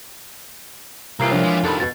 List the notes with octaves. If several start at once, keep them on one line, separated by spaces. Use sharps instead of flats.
C2 E3 A#3 F4 A#5 C7
F3 D4 C#5
G3 G#3
C2 F2 D3 D#3 A5 B5
B2 A6